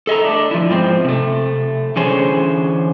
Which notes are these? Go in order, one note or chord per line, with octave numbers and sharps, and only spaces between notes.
A4 D#5 E5 A#5
A3 D4
F3 E4
G#2 F3 C4
C3 A3
D3 E3 C#4 G#4 C5 C#5